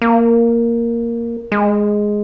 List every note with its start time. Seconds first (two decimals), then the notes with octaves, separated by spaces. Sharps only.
0.02 A#3
1.52 G#3